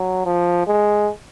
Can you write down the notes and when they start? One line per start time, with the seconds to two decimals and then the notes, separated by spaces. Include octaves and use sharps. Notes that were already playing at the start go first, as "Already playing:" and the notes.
Already playing: F#3
0.26 F3
0.67 G#3